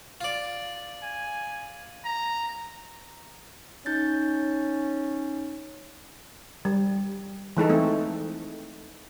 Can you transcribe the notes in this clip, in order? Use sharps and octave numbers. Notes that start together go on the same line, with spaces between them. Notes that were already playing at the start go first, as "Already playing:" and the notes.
F4 D5
G#5
A#5
C#4 D#4 G6 A6
G3
E3 G#3 D#4 A4
A3 C4